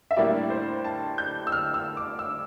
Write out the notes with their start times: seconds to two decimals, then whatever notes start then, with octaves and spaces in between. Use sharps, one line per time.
0.11 E5
0.17 A2 G3 A#3 D4 D5
0.50 C5
0.84 A5
1.18 G6
1.47 E6
1.52 F6
1.74 E6
1.97 D6
2.19 E6